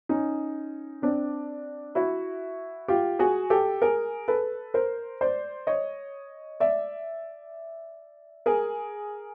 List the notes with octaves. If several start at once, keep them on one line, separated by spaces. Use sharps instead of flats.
C#4 D#4
C4 D4
E4 F#4
F4 G4
F#4 G#4
G4 A4
G#4 A#4
A4 B4
A#4 C5
C5 D5
C#5 D#5
D5 E5
G#4 A#4